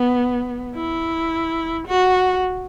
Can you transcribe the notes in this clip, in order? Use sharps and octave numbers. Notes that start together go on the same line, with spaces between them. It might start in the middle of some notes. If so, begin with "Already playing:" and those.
Already playing: B3
E4
F#4